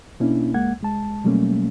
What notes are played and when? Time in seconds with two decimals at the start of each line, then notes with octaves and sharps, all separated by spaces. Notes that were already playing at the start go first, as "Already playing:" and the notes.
0.20 B2 A#3 C#4 D4 E4
0.54 C#2 G#3 A#3 F#5 G#6
0.81 C2 G#3 A5
1.24 B2 F#3 G3 A3 A#3 C#4